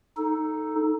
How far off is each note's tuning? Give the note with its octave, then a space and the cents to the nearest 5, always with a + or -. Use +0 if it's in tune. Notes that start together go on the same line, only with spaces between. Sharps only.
D#4 +0 A4 +0